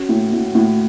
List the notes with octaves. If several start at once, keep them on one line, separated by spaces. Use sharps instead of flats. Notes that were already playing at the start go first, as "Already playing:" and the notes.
Already playing: C#4 F#4
A2
A2
A2